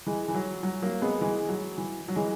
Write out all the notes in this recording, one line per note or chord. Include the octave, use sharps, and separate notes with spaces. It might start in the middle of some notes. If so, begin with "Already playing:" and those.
E3 G#3
E3
F#3
F#3
F#3 A#3
G#3 B3
E3 G#3
F#3
E3
F#3
E3 G#3